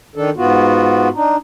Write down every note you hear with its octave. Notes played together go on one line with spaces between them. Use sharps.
D#3 D4 A4
G#2 B3 F4 F#4
D4 D#4